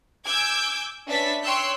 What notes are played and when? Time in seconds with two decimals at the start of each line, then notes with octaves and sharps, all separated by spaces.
0.25 G#5 D6 E6 G6 G#6
1.07 C#4 D4 B4 E5 A6 B6
1.42 C#5 G5 C6 E6 F#6 G6